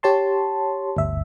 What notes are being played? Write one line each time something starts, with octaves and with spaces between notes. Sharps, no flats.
G4 C#5 A5 C6
G1 D2 E5